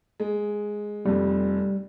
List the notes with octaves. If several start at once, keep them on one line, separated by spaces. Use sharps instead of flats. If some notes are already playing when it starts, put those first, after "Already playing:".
G#3
F1 F2 G3